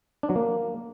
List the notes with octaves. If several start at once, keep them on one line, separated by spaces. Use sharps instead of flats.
D4
F#3
A#3